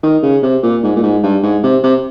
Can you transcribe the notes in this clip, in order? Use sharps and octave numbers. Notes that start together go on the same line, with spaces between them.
D#3
C#3
C3
A#2
G#2
A#2
G#2
G2
G#2
C3
C3